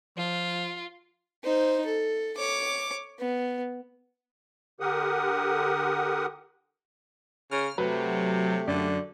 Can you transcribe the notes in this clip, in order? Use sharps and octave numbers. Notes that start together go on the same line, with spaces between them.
F3 F4
D#4 C5
A4
C#5 D6
B3
D3 G4 A#4 F#5 D#6
C#3 F6
C3 F#3 A3 G4 B4
F#2 D3 D5